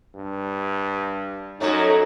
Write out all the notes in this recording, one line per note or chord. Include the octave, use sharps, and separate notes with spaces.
G2
F#2 A3 D#4 F#4 C#5